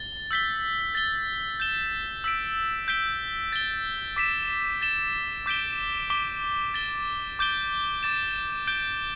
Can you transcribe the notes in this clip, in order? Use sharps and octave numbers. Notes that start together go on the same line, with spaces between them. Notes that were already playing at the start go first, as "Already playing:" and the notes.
Already playing: A6 G7
E6 G6 B6 G7
A6 G7
G6 E7 G7
E6 B6 D7
G6 B6 D7 G7
A6 G7
D6 B6 E7
A6 E7 G7
D6 G6 B6 D7 G7
D6 B6 G7
A6 G7
D6 G6 D7 G7
D6 A6 E7
G6 D7 G7